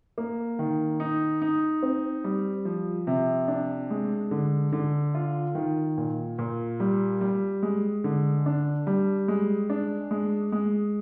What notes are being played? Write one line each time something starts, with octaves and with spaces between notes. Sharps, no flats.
A#3
D#3
D#4
D#4
C4
G3
F3
C3
D4
G#3
D3
D3
F4
D#3
A#2
A#2
G3
G3
G#3
D3
D4
G3
G#3
D4
G#3
G#3